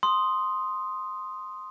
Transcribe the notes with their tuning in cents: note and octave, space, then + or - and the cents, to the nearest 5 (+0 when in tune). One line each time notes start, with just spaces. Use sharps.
C6 +0 D#6 +0